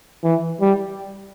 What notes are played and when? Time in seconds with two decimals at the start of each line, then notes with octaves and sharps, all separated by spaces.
0.24 E3
0.61 G3